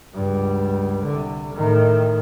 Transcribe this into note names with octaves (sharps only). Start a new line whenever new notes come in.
C#2 G2
C2 D3
A2 D#3